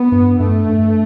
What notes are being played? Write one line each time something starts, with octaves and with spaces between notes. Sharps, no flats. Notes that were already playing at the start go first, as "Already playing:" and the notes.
Already playing: B3
G2
G2 A3
G2